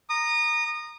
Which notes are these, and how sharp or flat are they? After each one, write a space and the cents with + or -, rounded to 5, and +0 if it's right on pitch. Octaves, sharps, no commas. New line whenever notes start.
A#5 +0 D#6 -25